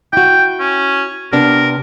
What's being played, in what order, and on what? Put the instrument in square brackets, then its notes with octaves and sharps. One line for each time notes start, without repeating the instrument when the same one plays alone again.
[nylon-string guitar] E4 F#4 [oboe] G5
[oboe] C#4
[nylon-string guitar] C3 B3 D4 [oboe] A#4